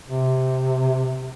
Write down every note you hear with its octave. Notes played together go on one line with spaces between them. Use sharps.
C3